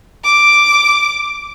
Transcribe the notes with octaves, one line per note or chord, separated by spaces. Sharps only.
D6